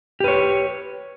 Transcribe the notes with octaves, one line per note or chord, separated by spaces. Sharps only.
G4 B4 C#5